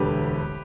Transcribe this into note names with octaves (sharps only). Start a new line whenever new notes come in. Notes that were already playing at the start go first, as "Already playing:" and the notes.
Already playing: E1 D2 D3 G4 B4